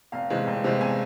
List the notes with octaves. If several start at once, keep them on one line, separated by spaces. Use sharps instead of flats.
F1 F5
E2 C3 G#3
F1
E2 C3 G#3
F1 G#5